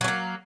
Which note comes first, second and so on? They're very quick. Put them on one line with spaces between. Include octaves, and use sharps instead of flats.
F#3 C#4 A#3